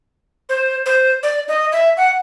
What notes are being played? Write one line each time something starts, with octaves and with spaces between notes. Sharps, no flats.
C5
C5
D5
D#5
E5
F#5